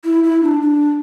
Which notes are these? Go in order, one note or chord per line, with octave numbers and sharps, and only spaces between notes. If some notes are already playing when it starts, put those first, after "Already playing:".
E4
E4
D4
D4